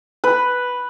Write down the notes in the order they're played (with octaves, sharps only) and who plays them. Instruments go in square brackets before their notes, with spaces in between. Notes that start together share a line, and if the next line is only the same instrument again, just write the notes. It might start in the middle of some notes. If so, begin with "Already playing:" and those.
[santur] B4